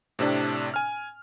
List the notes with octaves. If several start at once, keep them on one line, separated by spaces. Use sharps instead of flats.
A2 C3 C4 D4
G#5 F6